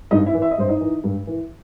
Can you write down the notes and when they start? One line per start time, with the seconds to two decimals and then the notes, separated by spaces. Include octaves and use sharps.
0.11 G2 D#4 D#5
0.26 E4 E5
0.34 E3
0.42 E5
0.51 D#5
0.58 G2 C5
0.69 D#4 D#5
0.81 E3
1.04 G2
1.27 E3